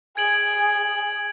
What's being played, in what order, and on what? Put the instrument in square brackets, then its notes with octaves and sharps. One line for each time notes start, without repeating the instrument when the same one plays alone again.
[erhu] G#4 [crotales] G#6 D7 F#7